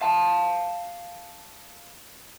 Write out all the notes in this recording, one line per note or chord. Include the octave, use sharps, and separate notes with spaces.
F5 A5